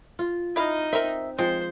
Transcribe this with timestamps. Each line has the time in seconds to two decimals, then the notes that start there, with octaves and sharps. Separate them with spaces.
0.19 F4
0.56 D#4 E4 D#5 F5
0.93 C4 A#4 E5
1.39 F3 G#3 C4 C5